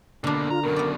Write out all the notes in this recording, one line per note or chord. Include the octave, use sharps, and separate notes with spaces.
B2 D3 A#3 D4
F4 A#5
F#2 B2 A#4
B3 D5